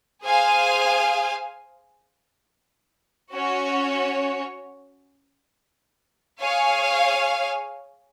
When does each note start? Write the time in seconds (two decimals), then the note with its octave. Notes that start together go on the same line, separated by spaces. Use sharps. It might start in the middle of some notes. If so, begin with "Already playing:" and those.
0.24 G#4 C5 F5 G#5
3.33 C#4 F#4 C#5
6.41 G#4 C#5 F5 G#5